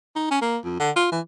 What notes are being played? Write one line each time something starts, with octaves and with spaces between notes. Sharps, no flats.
D#4
C#4
A#3
F2
D3
F4
E3